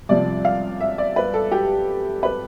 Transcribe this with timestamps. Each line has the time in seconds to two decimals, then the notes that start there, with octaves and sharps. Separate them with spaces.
0.09 C2 C3 F3 D5
0.45 F5
0.80 E5
0.98 D5
1.16 B4
1.34 A4
1.51 G4
2.23 B4